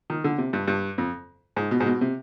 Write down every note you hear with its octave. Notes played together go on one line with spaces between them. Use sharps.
D#3
D3
C3
G2
G2
F2
G#2
B2
G#2
B2
C3